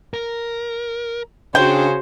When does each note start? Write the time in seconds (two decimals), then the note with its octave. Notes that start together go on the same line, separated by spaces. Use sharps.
0.14 A#4
1.55 C#3 D4 F#4 C5 C#5 G5